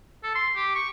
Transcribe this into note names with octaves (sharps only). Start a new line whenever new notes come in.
A4
C6
G4
C#6